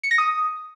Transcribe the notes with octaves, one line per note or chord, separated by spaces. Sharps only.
C#7
A#6
D#6